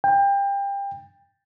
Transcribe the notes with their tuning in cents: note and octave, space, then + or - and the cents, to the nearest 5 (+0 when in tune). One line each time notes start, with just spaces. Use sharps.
G5 +25